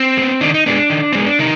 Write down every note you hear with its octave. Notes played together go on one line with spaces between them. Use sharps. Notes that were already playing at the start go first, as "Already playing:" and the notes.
Already playing: C4
G#3
B3
D#3 D4
D#4
G#3 B3 D4
D#3
C4
G#3 B3
D4
C3 D#3 D#4